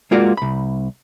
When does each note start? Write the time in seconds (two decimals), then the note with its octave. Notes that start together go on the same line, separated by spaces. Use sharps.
0.11 G#3 A#3 F4 F#4 D5
0.37 C2 B5